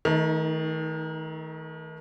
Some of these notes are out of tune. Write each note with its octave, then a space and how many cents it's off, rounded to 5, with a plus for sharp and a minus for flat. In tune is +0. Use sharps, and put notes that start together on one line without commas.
D#3 +35 A3 +0 D#4 +0